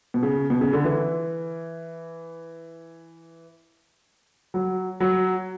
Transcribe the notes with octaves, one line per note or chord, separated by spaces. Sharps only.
B2
C#3
B2
C#3
D3
E3
F#3
F#3